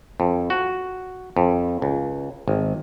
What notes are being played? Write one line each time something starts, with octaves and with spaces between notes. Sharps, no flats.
F2
F#4
F2
C#2
G#1